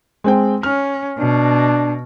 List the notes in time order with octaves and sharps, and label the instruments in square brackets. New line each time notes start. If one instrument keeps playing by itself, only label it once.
[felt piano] G#3 C4 G5
[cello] C#4 [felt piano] F6
[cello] B2 [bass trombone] D4